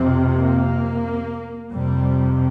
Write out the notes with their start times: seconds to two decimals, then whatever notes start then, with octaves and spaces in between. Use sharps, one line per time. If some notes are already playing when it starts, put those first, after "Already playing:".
Already playing: F2 C3 C4
0.34 A#3
1.72 F2 C3 G3